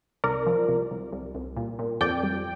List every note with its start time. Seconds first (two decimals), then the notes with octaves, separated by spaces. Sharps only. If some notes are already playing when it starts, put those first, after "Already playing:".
0.24 C2 A#4 D5
0.47 F3
0.69 C2
0.91 C2
1.12 C2
1.35 C2
1.57 A#2
1.79 A#2
2.01 F2 D5 G5
2.23 G3